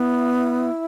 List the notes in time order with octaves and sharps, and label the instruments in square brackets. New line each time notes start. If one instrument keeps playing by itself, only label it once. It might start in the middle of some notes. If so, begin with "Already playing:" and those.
Already playing: [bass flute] B3 [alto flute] E4